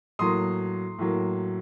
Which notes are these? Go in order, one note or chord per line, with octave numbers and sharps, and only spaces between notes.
A2 F#3 A#3 C6 D#6
A2 F#3 A#3